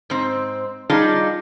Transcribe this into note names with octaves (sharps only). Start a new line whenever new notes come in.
G#2 C4
G3 D4 D#4 F4 G#4